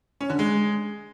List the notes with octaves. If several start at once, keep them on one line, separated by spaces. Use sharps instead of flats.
C#4
D3
G#3